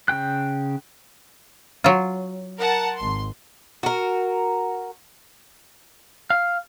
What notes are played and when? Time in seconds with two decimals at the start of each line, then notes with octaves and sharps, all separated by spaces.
0.08 C#3 F4 G5 F#6
1.84 F#3 F4
2.57 A#4 F#5 A5
2.96 G#1 C6
3.83 F#4 A#4
6.30 F5